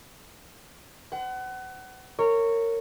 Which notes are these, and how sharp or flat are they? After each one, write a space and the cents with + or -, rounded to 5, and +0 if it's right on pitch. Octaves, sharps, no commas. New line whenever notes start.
C5 -40 F#5 +30
A#4 -25 C#5 +0